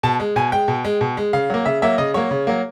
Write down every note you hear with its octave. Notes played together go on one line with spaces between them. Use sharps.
B2 A5
G#3
B2 G#5
G#3 G5
B2
G#3
B2
G#3
C#3 F5
F#3 A#3
C#3 E5
F#3 A#3 E5
C#3 D#5
F#3 A#3 C#5
C#3
F#3 A#3